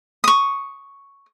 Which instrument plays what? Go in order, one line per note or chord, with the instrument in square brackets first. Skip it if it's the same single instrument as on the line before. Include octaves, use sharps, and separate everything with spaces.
[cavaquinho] C#6 D#6